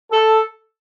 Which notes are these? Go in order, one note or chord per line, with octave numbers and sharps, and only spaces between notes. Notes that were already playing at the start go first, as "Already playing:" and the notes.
A4